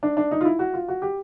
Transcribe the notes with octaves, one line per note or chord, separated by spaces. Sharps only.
D4
D4
D#4
F4
E4
F#4
F4
F#4
G4